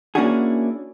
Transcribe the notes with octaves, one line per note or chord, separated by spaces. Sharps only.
A#3 C#4 D4 E4 F#4 G#4